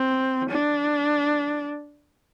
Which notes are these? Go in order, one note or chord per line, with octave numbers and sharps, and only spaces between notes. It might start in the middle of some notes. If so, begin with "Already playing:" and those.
Already playing: C4
D4